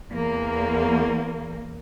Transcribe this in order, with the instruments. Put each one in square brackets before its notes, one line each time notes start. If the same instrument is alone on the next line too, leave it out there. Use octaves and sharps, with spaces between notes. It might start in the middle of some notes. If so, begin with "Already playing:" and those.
[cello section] E2 A#3